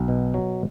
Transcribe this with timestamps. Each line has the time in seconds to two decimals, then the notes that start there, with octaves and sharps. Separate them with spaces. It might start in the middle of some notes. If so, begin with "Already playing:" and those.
Already playing: B1
0.08 B2
0.34 F#3